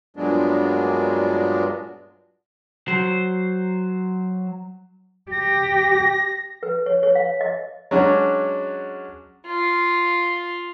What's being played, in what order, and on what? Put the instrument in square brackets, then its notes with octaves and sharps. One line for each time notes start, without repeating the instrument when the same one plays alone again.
[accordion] G2 A#2 F#3 G#3 B3 D4
[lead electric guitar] F#3 C5
[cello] G4 [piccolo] A#6
[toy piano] B4
C#5
C#5
F5
D#5
[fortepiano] F#3 G#3 C#4 D4 F#4
[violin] F4